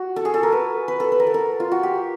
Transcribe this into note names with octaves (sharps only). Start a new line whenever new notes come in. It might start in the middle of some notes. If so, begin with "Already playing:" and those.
Already playing: F#4
A4
G#4
A4
A#4
B4
B4
A4
B4
A#4
A4
A#4
F4
F#4
G4